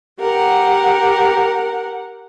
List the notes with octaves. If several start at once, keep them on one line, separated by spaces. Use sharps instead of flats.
G4 A#4 F#5